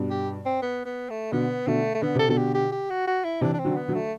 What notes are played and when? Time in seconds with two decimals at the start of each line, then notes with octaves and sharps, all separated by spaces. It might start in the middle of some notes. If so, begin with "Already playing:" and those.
Already playing: G2 B2
0.10 G4
0.45 C4
0.62 B3
0.85 B3
1.10 A3
1.32 B2 D3 B3
1.67 B2 D3 A3
1.94 A3
2.02 D3 B3
2.15 C3 A4
2.28 B2 D3 A4
2.38 G4
2.54 G4
2.72 G4
2.90 F#4
3.07 F#4
3.24 E4
3.41 C3 E3 D4
3.54 D4
3.59 C4
3.65 D3 F#3
3.77 B3
3.88 D3 F#3
3.94 A3